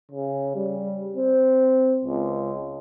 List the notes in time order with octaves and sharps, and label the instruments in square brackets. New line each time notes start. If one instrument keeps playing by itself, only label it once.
[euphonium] C#3
G3
C4
C#2